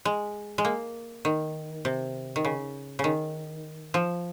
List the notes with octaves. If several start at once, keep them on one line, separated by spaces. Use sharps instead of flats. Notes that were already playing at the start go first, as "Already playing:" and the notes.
G#3
G#3
A#3
D#3
C3
D#3
C#3
C#3
D#3
F3